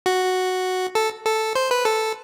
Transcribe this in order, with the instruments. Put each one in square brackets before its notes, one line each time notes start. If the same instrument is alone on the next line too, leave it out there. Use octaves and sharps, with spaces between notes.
[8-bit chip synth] F#4
A4
A4
C5
B4
A4